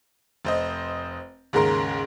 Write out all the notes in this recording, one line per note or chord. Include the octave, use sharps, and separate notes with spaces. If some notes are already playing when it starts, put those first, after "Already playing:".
F1 C5 D#5
D#2 G#2 C#3 A#4 C6 A#6